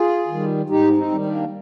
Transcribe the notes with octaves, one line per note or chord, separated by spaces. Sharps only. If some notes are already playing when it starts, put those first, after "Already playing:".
Already playing: F4 G#4
D#3
G3
G#2 D#4 G4
C4 D#4
D#3 G3
A#3 D4